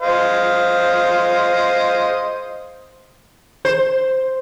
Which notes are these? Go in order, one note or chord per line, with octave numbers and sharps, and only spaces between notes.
C5 D#5 F5
C5